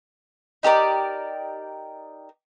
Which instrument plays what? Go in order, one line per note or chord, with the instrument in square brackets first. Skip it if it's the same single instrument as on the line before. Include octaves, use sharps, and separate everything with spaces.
[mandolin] D#4 G4 A#4 D5